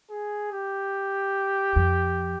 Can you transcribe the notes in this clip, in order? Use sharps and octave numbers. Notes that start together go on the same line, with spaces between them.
G#4
G4
F2